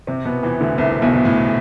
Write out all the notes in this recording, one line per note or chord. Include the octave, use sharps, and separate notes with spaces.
C3 C4
B2 B3
E2 E3
D2 D3
C2 C3
B1 B2
B2
A2